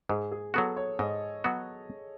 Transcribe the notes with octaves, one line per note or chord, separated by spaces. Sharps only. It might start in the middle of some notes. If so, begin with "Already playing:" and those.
G#2 G#4
G#4
F#3 B3 F#4 A4
C#5
G#2 D#5
F#3 B3 F#4